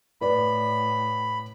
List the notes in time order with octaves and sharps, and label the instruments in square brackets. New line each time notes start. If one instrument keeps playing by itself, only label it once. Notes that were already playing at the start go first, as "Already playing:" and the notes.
[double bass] A2 [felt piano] B4 D5 [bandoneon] B5